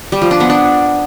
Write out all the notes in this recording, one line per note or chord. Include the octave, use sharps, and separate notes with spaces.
G3
F3
D4
B3
D4